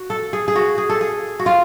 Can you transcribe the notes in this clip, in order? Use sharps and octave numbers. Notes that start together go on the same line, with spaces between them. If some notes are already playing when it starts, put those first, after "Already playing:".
Already playing: F#4
A4
G#4
G#4
F#4
G#4
A4
G#4
F#4
F4